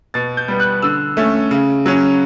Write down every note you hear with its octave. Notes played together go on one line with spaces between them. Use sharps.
B2 A6
G6
G3 B3
F#6
D3 E6
A3 C#4
C#3
F#3 C#4